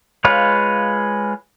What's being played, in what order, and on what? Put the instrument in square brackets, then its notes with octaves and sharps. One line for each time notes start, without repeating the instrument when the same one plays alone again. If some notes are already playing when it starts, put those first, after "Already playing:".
[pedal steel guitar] G#3 F4 B4 C#5 F5